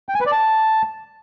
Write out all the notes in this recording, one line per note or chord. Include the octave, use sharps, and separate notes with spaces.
G5
G#5
B4
D5
A5